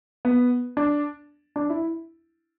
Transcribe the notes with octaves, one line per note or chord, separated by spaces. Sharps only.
B3
D4
D4
E4